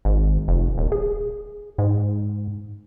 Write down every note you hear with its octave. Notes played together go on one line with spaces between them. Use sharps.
G#1
F1
D#1
G#4
G#2